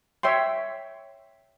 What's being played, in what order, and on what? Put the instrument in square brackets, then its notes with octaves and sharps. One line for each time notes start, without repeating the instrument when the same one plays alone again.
[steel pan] C#5 E5 G5 C6